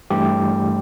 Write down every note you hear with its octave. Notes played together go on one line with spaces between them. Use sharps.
G2 E3 A3 G4